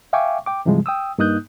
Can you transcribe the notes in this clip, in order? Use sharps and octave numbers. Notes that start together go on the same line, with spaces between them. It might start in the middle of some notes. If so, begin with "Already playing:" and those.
E5 F5 G5 G#5 C#6 D6
G5 D6
G2 C3 E3 F3 G3 G#3
G5 D#6 E6
G2 A#3 D#4 D#6 F#6 G6